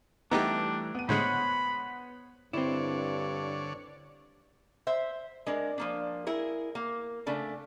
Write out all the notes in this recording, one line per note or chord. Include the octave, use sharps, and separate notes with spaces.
E3 G3 A3 B3 D4 D#4 G4 A#5
B3 D#7
A2 D3 G#3 C5 C#5 F#5 B5
G2 D3 C4 E4 C#5 D5
C5 E5
G#3 D4 A#4
F3 A#3 D4
E4 G#4 A#4
A#3
C#3 A3 D4